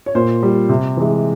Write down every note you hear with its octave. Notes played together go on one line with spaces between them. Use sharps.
C#5
A#2 C5
G3
C3
E3 G#3